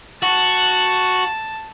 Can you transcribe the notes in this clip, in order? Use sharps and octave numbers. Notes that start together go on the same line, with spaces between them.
F#4 A5